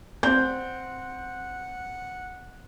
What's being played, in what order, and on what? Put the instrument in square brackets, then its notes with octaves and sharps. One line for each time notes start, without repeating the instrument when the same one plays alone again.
[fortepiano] C4 [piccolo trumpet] F#5 [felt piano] G6